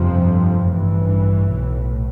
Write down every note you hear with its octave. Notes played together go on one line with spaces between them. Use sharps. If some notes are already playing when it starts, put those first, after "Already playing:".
Already playing: G1 F2 C3 F3
A1 G2 E3
B1 A2